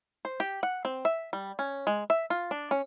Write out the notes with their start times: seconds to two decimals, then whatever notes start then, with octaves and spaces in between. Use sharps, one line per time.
0.25 C5
0.40 G4
0.63 F#5
0.85 C4
1.05 E5
1.33 G3
1.59 C#4
1.87 G#3
2.10 E5
2.30 F4
2.51 D4
2.71 C#4